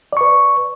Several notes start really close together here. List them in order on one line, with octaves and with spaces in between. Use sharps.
D5 C#6 B4